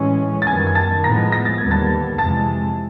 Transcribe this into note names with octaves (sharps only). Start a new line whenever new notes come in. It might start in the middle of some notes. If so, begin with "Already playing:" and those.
Already playing: A2 E3 G#3 C#4
A6
F#2 D#3 G3 B3 G#5 G#6
G#6
A5 A6
A2 F3 G#3 B3 A#5 A#6
A#6
A6
D#2 D3 G3 B3 G#6
A5 A6
F2 C3 E3 G#3 A5 A6